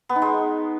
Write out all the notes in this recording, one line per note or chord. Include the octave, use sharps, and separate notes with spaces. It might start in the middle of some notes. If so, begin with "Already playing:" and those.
B3
D#4
G#3